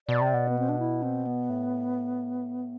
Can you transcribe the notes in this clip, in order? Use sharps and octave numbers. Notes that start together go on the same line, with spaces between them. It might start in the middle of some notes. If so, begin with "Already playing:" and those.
B2 D5
C3
B2
B3
C4
D4
E4
C4
B3
A2